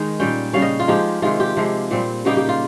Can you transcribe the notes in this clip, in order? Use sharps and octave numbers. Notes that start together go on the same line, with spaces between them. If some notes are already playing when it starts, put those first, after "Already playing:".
Already playing: D#3 G#3 D#4
A#2 G3 C#4 G5
C#3 G3 C#4 F5
D#5
F4
F3 G#3 D#4 G4
C3 D#3 G#3 F4
G4
C3 F3 G#3
A#2 G3 C4
C#3 G3 A#3 D#4 G4
G4
F4